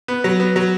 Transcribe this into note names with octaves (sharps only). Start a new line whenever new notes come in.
B3
F#3
B3
F#3